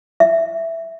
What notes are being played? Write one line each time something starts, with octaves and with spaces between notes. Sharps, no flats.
E5